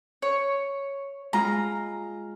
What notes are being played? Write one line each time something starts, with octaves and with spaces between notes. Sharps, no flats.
C#5
G#3 F4 A#5